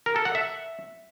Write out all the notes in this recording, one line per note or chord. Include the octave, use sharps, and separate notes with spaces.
A#4
A4
F#5
E5